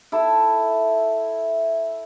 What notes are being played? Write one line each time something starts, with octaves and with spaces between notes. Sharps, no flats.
E4 A4